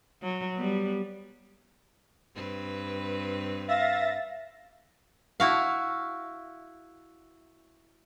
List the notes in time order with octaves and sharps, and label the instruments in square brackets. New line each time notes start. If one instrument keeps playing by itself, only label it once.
[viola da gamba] F#3
G3 B3
G2 C4 B4
[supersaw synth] E5 A6 A#6 [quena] F5
[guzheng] E4 F#4 F5